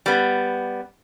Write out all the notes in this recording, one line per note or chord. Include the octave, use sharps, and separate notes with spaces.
G3 B3